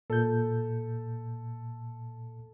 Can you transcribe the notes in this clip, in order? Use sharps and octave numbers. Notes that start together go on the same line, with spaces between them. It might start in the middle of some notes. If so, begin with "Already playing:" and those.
A#2 A4 G6